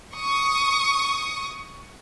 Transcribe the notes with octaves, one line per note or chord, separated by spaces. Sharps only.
C#6 D#6